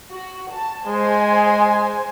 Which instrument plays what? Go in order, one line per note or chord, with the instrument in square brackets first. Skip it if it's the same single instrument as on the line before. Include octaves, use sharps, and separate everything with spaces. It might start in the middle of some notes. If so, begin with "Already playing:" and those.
[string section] F#4
A5
[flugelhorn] G#3 [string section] C5 G#5